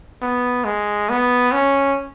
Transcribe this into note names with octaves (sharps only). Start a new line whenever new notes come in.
B3
G#3
B3
C#4